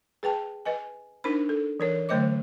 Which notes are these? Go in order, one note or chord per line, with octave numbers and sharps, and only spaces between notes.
G#4 B4 G5 A5
B4 D#5 G#5
D4 D#4 A#4 C5 B5
A4
E3 A#4 C#5
D3 F#3 A3 C5 D#5 D6